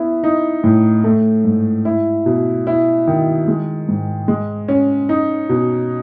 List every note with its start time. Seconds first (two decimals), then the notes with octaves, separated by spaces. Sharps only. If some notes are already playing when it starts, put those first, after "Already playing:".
Already playing: B3 E4
0.24 D#4
0.64 A2
1.04 A3
1.45 G#2
1.85 E4
2.26 B2
2.67 E4
3.07 D#3
3.48 G#3
3.88 G#2
4.28 G#3
4.68 C#4
5.09 D#4
5.49 B2